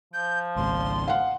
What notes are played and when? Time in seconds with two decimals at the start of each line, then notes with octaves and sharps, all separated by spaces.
0.14 F3 G6
0.56 G#1 C#2 C6
1.08 F5 F#5